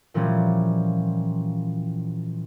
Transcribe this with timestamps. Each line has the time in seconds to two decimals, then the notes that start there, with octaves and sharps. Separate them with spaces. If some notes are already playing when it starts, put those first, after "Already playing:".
0.14 A#2 E3 F3 G3 C#4